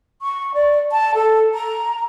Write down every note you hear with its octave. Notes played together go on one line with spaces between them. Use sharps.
C#6
D5
A5
A4
A#5